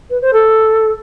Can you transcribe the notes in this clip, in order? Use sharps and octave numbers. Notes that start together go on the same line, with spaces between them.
B4
C5
A4